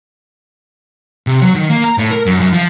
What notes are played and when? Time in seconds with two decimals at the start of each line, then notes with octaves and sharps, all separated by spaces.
1.27 C3
1.41 F#3
1.55 D#3
1.69 A#3
1.84 A#5
1.98 A2
2.11 A#4
2.26 F#2
2.40 F#2
2.52 F3